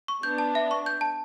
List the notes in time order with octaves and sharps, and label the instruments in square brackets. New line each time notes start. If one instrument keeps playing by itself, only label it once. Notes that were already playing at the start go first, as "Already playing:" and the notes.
[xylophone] C#6
[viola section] B3 D4 [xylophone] G6
[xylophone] A5
E5
C#6
G6
A5